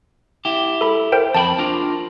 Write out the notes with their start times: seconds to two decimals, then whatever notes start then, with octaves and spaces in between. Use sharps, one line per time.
0.45 E4 G4
0.81 A4 B5
1.12 A#4 C5 G5
1.34 F2 G4 G5 A5 B5
1.59 D4 F4 A#4